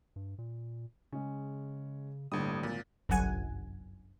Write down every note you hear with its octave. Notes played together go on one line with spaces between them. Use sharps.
G2
A#2
C#3 G#3 C#4
G1 A2 D3 G3 A#3 D#6
G#1 A#2
G1 C2 F#2 F#5 G#5